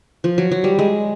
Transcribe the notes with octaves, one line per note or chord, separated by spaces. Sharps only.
F3
F#3
F#3
G3
G#3